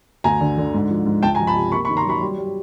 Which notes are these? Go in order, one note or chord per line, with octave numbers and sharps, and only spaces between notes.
D2 G#5 A#5
D3
D3
G#2
F3
G#2
C#2 G5 A5
G#5 A#5
F3
A5 B5
C3
A#3 B5 C#6
B5 C#6
D#3
A#5 C6
F#3 B5 C#6
G3
G3